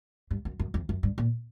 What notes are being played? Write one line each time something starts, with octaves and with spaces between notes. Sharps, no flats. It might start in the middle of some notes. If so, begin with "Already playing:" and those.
G2
F#2
F#2
F2
F#2
G2
A#2